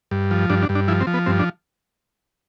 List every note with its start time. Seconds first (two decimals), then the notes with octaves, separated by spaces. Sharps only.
0.11 G2
0.31 F3
0.50 G2 D4
0.62 D4
0.69 G2
0.75 D4
0.88 F3 E4
1.01 C4
1.07 F3
1.14 B3
1.26 G2 C4
1.39 D4